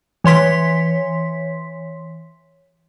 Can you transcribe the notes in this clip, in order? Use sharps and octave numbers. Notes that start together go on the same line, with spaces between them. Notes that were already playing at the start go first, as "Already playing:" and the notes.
E3 C#5 C6 B6